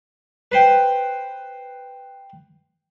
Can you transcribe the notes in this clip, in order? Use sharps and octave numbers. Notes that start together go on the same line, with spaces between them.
B4 C5 G5